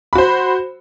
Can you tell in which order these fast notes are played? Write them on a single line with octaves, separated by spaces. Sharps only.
B5 F#4 C5